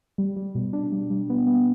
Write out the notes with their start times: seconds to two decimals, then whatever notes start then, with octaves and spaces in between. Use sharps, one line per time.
0.18 G3
0.36 G3
0.55 B2
0.73 D4
0.92 G3
1.10 G3
1.30 B3
1.47 B3